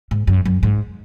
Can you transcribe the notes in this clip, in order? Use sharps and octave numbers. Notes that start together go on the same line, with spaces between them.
G#2
F#2
F#2
G#2